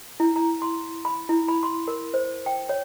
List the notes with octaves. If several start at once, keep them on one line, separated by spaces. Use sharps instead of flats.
E4
A#5
C6
B5
E4
B5
C6
A#4
C5
G5
C#5